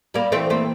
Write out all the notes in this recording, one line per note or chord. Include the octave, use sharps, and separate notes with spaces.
G3 A#3 A#4
E3 A3 C4
A3 A#3 C4